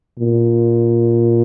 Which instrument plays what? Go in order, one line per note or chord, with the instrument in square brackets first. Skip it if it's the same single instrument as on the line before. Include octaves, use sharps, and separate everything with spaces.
[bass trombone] A#2